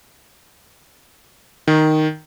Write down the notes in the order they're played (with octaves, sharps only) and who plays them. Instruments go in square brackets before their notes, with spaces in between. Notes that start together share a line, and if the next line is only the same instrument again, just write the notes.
[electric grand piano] D#3